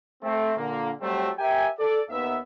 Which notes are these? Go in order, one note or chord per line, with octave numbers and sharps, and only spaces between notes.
A3 C4
A#2 D3 A#3
F#3 G3 A3 C4
G4 A#4 E5 G5 G#5
A4 D5
D#2 B3 E5